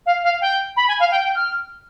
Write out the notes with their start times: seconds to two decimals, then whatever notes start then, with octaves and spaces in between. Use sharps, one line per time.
0.06 F5
0.24 F5
0.41 G5
0.76 B5
0.88 G#5
1.00 F5
1.11 G5
1.23 G5
1.35 F6